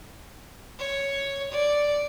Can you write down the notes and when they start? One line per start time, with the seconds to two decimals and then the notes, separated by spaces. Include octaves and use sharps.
0.79 C#5
1.51 D5